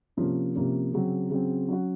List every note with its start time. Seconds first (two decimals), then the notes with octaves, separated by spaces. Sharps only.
0.17 C3 F3 A#3 C#4
0.55 C3 F3 A#3 C#4
0.93 C#3 F#3 C4
1.30 C#3 F#3 C4
1.68 F#3 C#4 F#4